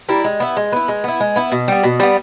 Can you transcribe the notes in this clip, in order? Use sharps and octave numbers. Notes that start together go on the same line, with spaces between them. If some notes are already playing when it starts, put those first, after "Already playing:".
G3 A#3 E4
G#3
B3 E4
G#3
B3 E4
G#3
B3 E4
G#3
B3 E4
B2
G3 B3
B2
G3 B3